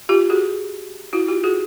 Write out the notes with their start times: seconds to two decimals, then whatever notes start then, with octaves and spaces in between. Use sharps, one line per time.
0.09 F4 G4
0.30 F#4 G#4
1.13 E4 F#4
1.28 F4 G4
1.44 F#4 G#4